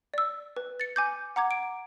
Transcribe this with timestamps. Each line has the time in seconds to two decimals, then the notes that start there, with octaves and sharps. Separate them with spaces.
0.14 D5 E6
0.56 B4
0.80 A6 C#7
0.96 G#5 D6 G6
1.36 F#5 A#5 D6 G#6
1.51 D7